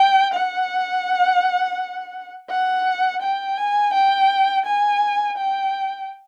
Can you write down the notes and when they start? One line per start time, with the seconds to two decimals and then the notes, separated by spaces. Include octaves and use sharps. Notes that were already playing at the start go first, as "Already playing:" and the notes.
Already playing: G5
0.34 F#5
2.49 F#5
3.22 G5
3.57 G#5
3.93 G5
4.66 G#5
5.38 G5